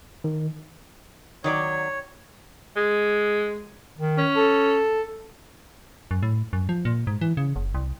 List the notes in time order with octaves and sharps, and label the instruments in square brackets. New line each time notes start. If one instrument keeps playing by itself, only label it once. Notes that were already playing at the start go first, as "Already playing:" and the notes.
[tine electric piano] D#3
[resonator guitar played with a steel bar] D#3 F#3 D5 [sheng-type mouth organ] C#5
[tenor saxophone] G#3
[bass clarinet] D#3
[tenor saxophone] C#4
[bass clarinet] A4
[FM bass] F#2
A2
F#2
F3
A#2
G#2
E3
C#3
F#1
C2